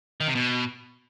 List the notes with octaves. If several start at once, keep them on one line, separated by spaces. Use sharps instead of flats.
D#3
C3
B2